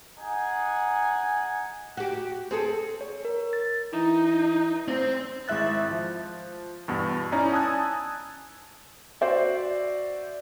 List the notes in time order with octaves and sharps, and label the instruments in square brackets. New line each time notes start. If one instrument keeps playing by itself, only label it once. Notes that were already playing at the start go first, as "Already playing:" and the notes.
[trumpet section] D#4 G#4 F#5 G#5
[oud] F#4 G4
C4 G#4 A4
[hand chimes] C#5
A#4
A6
[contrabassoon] E3 [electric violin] D#4
[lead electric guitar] C4 C5
[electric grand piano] G#1 G#3 E4 E5 F#6 A6
F3
E2 G2 B2
C#4 D#4 E4 D5 A#5
G#5 A5 D#6 E6 F#6 G#6
[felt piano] F#4 C5 D5 E5